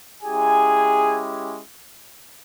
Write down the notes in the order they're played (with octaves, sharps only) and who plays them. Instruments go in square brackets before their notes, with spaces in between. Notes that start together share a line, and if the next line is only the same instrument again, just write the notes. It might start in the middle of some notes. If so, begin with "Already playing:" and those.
[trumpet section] G#3 C#4 E4 G4 G#4 G#5